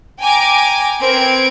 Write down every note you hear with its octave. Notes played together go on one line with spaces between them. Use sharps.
G5 G#5 A#5 D6
C4 A#4 B4 G#6 C#7 D7